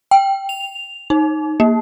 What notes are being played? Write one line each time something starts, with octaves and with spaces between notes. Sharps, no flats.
G5
F7
D#4
A#3